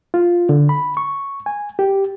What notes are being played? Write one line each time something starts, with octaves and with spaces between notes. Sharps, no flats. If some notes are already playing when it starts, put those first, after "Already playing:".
F4
D3
B5
C#6
G#5
G4